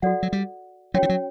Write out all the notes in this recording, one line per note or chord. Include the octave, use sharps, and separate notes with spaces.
F#3 F#4 A4 D5 F#5
F#3
G3
F#3 C#4 F#4 C#5 G5
E3
F#3